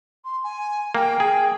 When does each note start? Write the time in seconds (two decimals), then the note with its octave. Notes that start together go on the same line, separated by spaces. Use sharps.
0.24 C6
0.43 G#5
0.95 A#3 G5
1.20 G#4